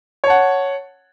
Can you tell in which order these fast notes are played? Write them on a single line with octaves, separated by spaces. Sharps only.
C#5 A5 F#5